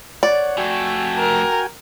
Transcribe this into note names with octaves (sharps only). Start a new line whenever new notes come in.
C#5 D5 F#5
F2 A3 F#4 G5 G#5
A#4